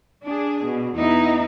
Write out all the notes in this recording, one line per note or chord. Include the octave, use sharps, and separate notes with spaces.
D4 G#4
B2
E2 B3 D#4 E4